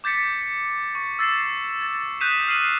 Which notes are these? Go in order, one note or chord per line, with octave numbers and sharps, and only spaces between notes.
D6 G6 A6 B6 C#7
C#6
E6 A6 C7 E7
A6
D#6 F#6 G6 B6 D#7 E7
D#6 F6 C7 D#7 F#7